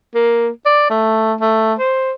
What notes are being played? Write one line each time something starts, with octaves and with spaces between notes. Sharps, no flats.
A#3
D5
A3
A3
C5